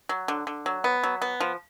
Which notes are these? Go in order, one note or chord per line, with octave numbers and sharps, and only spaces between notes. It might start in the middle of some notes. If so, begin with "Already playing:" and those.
F#3
D3
D3
F#3
B3
F#3
B3
F3